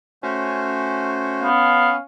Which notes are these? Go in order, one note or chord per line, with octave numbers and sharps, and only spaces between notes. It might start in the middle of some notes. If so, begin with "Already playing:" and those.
A3 C#4 F#4 C5
B3 F5